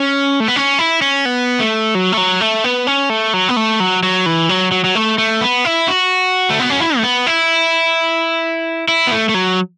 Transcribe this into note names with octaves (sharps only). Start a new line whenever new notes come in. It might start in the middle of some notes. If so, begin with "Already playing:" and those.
Already playing: C#4
A3
B3
C#4
E4
C#4
B3
A3
F#3
A3
F#3
A3
B3
C#4
A3
F#3
B3
A3
F#3
F#3
E3
F#3
F#3
F#3
A3
A3
B3
E4
F#4
A3
B3
C#4
E4
A3
B3
E4
E4
B3
A3
A3
F#3